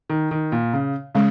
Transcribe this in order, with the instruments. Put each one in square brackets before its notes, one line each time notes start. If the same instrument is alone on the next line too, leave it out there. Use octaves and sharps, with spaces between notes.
[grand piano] D#3
D#3
A#2
C#3
[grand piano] C#3 [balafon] G#3